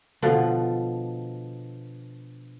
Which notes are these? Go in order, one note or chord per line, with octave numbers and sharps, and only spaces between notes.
B2 D3 F3